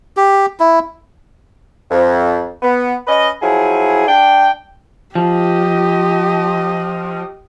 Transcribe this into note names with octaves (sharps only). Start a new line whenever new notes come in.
G4
E4
F2
B3
C#4 B4 D#5
F3 F#3 E4 G#4
D4 G5
F3 G4 D#5